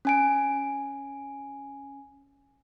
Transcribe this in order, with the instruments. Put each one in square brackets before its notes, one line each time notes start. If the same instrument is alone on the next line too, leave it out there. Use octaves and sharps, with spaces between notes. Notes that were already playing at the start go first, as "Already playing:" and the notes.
[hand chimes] C#4 G#5 D7